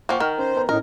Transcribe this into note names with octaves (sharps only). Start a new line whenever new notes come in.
F3 A#3 F#5 G5 C#6
D#3 A#4
C#4 C5
B3 A#5
A2 C#4 D#4 A#4